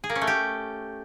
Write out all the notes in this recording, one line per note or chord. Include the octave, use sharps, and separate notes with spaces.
G#4
A#3
C#4
A3
G4